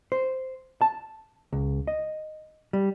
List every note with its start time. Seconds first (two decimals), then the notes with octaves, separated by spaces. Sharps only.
0.12 C5
0.82 A5
1.53 C#2
1.87 D#5
2.73 G3